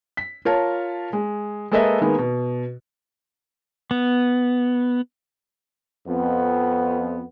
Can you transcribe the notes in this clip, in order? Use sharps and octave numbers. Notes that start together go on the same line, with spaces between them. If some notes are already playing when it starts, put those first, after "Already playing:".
B6
F4 A#4 C#5 A5
G#3
G#3 A#3 A4 B4 D#5 E5
D#3 G#3 A#3 B3
B2
B3
F2 B3